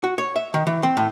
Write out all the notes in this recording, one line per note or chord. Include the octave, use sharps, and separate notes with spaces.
F#4
C#5
E5
D#3
E3
C4
A2